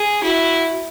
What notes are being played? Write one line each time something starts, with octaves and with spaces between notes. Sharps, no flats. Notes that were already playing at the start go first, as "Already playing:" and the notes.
Already playing: G#4
E4 F#4